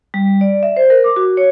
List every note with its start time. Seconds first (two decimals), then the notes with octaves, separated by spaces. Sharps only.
0.14 G3
0.41 D5
0.63 E5
0.77 C5
0.90 A#4
1.04 D6
1.16 F#4
1.37 C#5